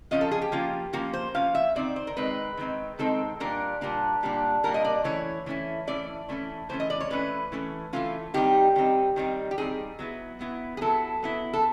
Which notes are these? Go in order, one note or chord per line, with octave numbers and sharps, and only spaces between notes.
F3 A#3 C#4 F4 D#5
A4
G#4
G4
F3 A#3 C#4 F4
F3 A#3 C#4 F4 F#4
C5
F3 A#3 C#4 F4 F5
E5
D#3 G#3 C4 D#4 D5
C5
A#4
D#3 G#3 C4 D#4 B4
D#3 G#3 C4 D#4
D#3 G#3 C4 D#4 A4
A#2 G3 A#3 D4 A#4
A#2 G3 A#3 D4
A#2 G3 A#3 D4
A#2 G3 A#3 D4 A#4
D#5
D5
E3 A3 C#4 E4 C#5
E3 A3 C#4 E4
E3 A3 C#4 E4 D5
E3 A3 C#4 E4
E3 A3 C#4 C5
D#5
D5
C#5
E3 A3 C#4 B4
E3 A3 C#4
E3 A3 C#4 F4
D#3 G3 C4 D#4 G4
D#3 G3 C4 D#4
D#3 G3 C4 D#4
G4
D#3 G3 C4 D#4 G#4
F#3 B3 E4
F#3 B3 E4
G#4
F#3 B3 E4 A4
F#3 B3 E4
A4